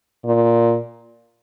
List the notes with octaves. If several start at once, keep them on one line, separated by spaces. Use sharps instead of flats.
A#2